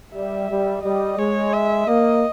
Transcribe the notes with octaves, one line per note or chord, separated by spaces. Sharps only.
G3 E5
G3
G3 D#5
G#3 C#5
E5
A#3 D#5